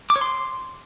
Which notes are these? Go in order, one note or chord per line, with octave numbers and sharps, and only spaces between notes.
D6
C#5
C6